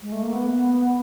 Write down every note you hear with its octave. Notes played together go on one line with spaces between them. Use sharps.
G#3
A3
A#3
B3